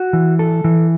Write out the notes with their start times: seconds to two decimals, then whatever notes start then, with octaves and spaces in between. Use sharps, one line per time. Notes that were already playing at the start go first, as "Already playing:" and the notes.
Already playing: F#4
0.13 E3
0.39 A4
0.64 E3